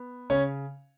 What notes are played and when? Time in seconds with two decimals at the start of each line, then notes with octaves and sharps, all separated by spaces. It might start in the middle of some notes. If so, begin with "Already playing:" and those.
Already playing: B3
0.30 C#3 C#4 C#5